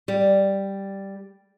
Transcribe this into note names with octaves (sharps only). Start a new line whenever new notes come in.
G3